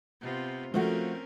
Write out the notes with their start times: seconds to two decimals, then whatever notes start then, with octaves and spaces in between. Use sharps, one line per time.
0.21 C3 B3 F4
0.74 F3 A3 C4 C#4 F#4 A#4